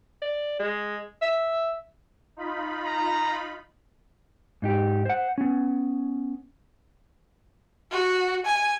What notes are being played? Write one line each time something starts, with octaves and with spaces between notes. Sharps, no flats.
D5
G#3
E5
D#4 F4 B5
A#5
G#2 D#4 G4
C5 F#5
B3 C#4
F#4
G#5